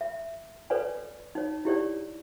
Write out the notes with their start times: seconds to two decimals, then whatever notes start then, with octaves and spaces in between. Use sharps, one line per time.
0.01 E5
0.70 A4 B4 C#5 D5 G#5
1.35 D#4 C#5
1.65 E4 G4 C#5 D5